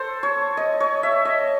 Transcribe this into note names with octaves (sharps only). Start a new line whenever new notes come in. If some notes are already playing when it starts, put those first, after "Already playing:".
Already playing: A4 C5
C#5
D#5
C#5
E5
D#5